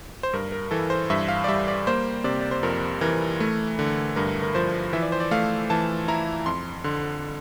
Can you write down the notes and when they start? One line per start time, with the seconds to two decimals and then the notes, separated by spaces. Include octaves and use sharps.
0.23 C5
0.33 G2 A#4
0.52 A#4
0.71 E3 A4
0.90 C5
1.10 G2 E5
1.28 F5
1.44 D5
1.48 G3 E5
1.68 D5
1.87 A#3 C5
2.24 C3 D5
2.41 D5
2.51 C5
2.63 F2 A#4
3.01 E3 A#4
3.40 A3
3.79 D3
4.16 G2 A#4
4.42 A#4
4.55 F3 C5
4.93 E3 E5
5.02 D5
5.12 C5
5.20 D5
5.31 A3 F5
5.70 E3 A5
6.08 E4 A#5
6.46 F2 C6
6.84 D3 C6